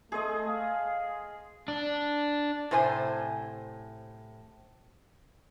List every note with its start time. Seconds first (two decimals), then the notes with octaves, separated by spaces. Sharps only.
0.12 A3 G#4 C5 D#5
0.48 F5
1.68 D4
2.71 A2 C3 C5 G#5